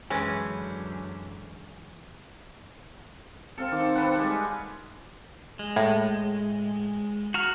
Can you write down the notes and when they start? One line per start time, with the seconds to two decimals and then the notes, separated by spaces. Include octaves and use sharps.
0.10 F#2 D3 E3 G#3 C#4 B4
3.58 C4 A4 F5
3.72 D#3 D6
3.95 A4 B4 F#5
4.16 G3 G#3
5.59 G#3
5.76 A2
7.34 F#4 A#5 F6